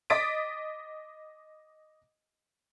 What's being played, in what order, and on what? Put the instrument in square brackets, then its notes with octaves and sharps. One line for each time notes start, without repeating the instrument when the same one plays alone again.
[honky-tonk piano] D#5 D6 A6 B6 D7